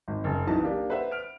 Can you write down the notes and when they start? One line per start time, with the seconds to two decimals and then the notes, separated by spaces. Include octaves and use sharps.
0.08 G#1
0.24 F#1
0.47 B1 E3 D#4 B4 A5
0.62 A#3 D4 G4
0.90 B4 C5 E5 F#5
1.11 F6 D7